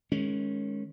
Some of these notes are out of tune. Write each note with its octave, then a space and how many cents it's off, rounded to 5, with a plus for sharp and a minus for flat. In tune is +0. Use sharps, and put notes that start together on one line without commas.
D#3 +0 G#3 +15 C#4 -5